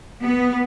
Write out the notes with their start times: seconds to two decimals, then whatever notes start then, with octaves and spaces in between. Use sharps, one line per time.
0.22 B3